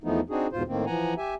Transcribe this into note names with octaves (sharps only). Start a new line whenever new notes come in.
E2 E3 F3 A3 B3 D#4
C4 D4 D#4 F#4 G#4
E2 G#2 B2 F4 C5
A2 D#3 A#3 C4
E3 F3 F#5 G#5 A#5
G4 E5 G#5